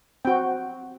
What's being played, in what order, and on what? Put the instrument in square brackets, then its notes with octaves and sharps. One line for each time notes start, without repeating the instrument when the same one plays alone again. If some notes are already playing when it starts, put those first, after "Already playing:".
[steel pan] C4 F#4 G5